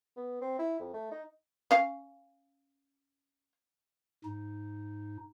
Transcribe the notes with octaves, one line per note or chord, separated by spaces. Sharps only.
B3
C4
E4
F2
A3
D#4
C#4 F5
G#2 D#4